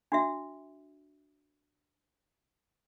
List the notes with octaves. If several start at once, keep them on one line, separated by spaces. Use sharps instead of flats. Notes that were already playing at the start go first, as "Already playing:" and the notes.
D4 F#4 E5